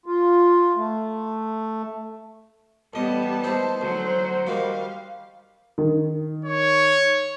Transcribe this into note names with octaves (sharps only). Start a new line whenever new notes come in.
F4
A3
A1 G3 B3 D#5 A5
D#4 E4 G#4 C5
D2 F#3
D#3 G3 F#4 F5
D#3
C#5